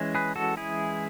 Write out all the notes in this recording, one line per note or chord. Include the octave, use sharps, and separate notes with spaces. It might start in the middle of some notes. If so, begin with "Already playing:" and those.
Already playing: E3 G#3 C#4
G#4 B4
F#4 A4
E4 G#4